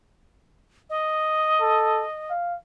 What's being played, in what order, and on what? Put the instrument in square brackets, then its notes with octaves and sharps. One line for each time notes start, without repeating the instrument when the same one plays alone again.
[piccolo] D#5
[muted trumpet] A4
F5